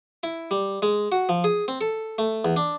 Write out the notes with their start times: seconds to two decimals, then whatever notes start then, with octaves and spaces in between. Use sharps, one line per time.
0.23 E4
0.51 G3
0.82 G#3
1.12 F#4
1.29 F3
1.44 G#4
1.68 C4
1.81 A4
2.18 A3
2.45 E2
2.56 D4